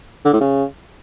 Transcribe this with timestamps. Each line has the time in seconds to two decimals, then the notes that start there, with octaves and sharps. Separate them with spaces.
0.25 D3
0.33 A2
0.41 C#3